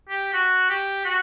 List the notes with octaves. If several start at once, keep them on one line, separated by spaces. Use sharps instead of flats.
G4
F#4
G4
F#4